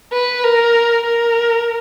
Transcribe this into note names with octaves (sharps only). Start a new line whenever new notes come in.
B4
A#4
A#4